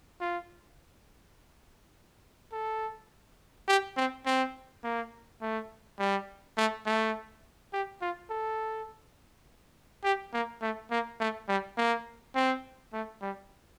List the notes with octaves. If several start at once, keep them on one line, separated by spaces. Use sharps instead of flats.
F4
A4
G4
C4
C4
A#3
A3
G3
A3
A3
G4
F4
A4
G4
A#3
A3
A#3
A3
G3
A#3
C4
A3
G3